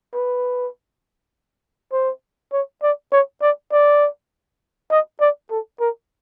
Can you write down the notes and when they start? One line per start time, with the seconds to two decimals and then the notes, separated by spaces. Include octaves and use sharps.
0.14 B4
1.92 C5
2.53 C#5
2.82 D5
3.12 C#5
3.42 D5
3.72 D5
4.91 D#5
5.20 D5
5.50 A4
5.80 A#4